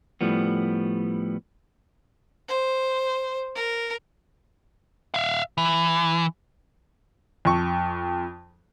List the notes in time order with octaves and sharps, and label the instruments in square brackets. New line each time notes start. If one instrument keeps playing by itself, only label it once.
[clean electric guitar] A2 F3 G3 B3
[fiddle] C5
A#4
[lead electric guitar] E5 F5
E3
[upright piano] F2 C#6